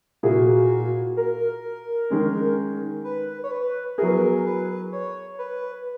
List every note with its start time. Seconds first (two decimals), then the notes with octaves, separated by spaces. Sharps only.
0.23 A#2 A#3 E4 F#4 G#4
1.17 A#4
2.10 D#3 G#3 C#4
3.04 B4
3.44 C#5
3.51 B4
3.98 F#3 B3 E4 G#4 A#4
4.08 B4
4.16 A#4
4.46 B4
4.92 C#5
5.39 B4